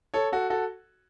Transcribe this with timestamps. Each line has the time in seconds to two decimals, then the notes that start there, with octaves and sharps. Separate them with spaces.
0.14 A4 C#5
0.32 F#4 A4
0.50 F#4 A4